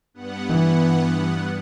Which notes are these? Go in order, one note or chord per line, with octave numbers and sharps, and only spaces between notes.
G2 B3 F#5
E3